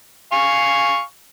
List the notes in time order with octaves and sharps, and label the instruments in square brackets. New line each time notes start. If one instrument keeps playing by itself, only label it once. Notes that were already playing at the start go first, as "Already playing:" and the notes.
[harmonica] F5 G#5 C#6